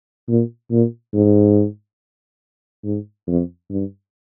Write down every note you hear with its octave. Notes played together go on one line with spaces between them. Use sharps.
A#2
A#2
G#2
G#2
F2
G2